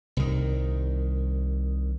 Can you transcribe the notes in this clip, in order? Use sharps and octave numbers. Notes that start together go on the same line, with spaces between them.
C2 D#3